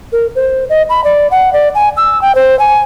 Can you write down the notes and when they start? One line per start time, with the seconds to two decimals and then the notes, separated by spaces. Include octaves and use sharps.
0.12 A#4
0.35 C5
0.69 D#5
0.89 B5
1.04 D5
1.31 F#5
1.53 D5
1.75 G#5
1.97 E6
2.21 G5
2.35 C5
2.59 G#5